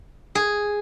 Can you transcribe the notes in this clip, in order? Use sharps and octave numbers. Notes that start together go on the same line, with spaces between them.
G#4